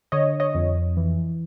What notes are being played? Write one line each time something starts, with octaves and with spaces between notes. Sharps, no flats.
D3 C#5 D#5
C#5 D#5
F2
E3